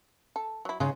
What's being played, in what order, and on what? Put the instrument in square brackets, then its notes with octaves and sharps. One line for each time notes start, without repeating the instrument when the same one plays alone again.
[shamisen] A4
F#3 E4
[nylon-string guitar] C#3 [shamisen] G#3 D#4 F4